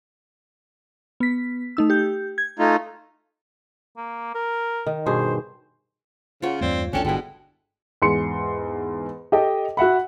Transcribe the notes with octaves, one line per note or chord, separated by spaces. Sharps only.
B3 B6
A3 D#4 E6
G4 G6
G#6
A3 D#4 F4
A#3
A#4
D#3
G2 B2 G#4 C5
C#3 F4 C#5 F#5
E2 G2 A3 C4 D5
A1 E2 C#4 D4 A4 G5 A5
G1 B2 G#3 E4 G5
E2 G#2 C6 C#7
G4 A4 D#5 G5
F#4 E5 F#5 B5